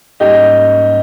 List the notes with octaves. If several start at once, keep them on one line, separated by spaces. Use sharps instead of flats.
G#2 G3 A#3 C#4 D#4 G4